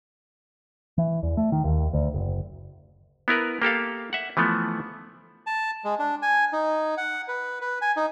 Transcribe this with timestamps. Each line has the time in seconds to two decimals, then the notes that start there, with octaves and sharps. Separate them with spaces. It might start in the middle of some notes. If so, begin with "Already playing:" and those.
0.98 E3
1.23 E2
1.37 A3
1.52 D#3
1.64 D#2
1.93 D2
2.14 F#1
3.28 B3 E4 A#4 B4
3.62 A#3 G4 A4 F5
4.13 E5 F#5
4.37 E3 F3 A3 B3
5.47 A5
5.84 G#3
5.99 D4
6.22 G#5
6.53 D#4
6.97 F#5
7.28 B4
7.61 B4
7.81 G#5
7.97 D#4